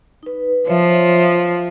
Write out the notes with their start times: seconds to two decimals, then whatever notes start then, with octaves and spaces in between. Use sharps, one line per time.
0.23 D#4 B4
0.67 F3 C#5 E5